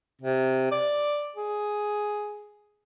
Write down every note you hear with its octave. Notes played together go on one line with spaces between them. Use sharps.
C3
D5
G#4